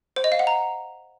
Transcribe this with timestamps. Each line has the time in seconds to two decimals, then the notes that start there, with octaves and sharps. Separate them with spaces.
0.16 C5
0.24 D#5
0.32 F5
0.39 F#5
0.47 A#5